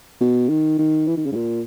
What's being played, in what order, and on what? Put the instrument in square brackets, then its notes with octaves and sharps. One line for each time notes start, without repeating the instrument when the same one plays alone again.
[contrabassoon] B2
D#3
D#3
E3
D#3
C#3
G#2
A#2